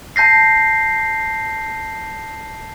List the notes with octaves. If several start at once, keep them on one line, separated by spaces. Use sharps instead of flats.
A5 G6 A#6 C7